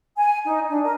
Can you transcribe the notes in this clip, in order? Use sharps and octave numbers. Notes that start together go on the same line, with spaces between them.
G#5
D#4
D4
A#4